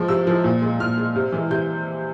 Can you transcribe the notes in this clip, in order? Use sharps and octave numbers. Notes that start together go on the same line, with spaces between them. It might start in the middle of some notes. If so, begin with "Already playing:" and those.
Already playing: F3 G#3 C#6
C3 E6
F3 G#3
A#2
G#3
A#2 F6
G#3
C3
E3 G#3
C3 G6